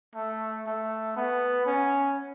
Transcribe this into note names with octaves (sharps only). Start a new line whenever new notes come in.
A3
A3
B3
C#4